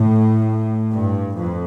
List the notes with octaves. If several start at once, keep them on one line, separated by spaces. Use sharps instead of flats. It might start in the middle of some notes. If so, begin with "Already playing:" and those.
Already playing: A2
G2
F2